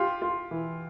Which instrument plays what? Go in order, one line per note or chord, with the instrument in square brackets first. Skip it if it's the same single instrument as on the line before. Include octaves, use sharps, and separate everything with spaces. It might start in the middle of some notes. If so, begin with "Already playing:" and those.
Already playing: [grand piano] F4 [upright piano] G4
[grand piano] F4
E3